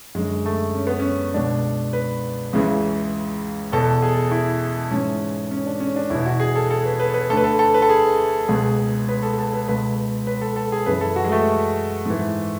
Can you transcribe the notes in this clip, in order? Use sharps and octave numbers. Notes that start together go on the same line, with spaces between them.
F#2 D3 G#3
A3
C#4
B3
C#4
C#2 B2 D4
B4
C#2 C#3 E3
E2 B2 A4
G#4
E4
G#2 E3 C#4
C#4
D4
C#4
D4
E2 B2 E4
E4
F#4
G#4
A4
A4
B4
B4
B4
D2 D3 A4 B4
A4
A4
B4
A4
G#4
C#2 B2 G#4
B4
A4
A4
B4
C#2 B2 B4
B4
A4
A4
G#4
F#2 C#3 E3 B4
A4
F#4
G#3
A3
G#2 E3